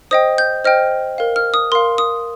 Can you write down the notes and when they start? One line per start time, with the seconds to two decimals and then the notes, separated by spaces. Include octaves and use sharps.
0.11 C5 D#5 G5 D#6
0.38 G6
0.64 C5 D#5 G5 F6
1.18 A#4 F5
1.36 F6
1.54 D#6
1.72 A#4 F5 C6
1.98 D#6